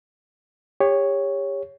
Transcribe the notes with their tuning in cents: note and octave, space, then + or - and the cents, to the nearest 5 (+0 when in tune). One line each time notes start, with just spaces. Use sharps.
G4 +35 C#5 +0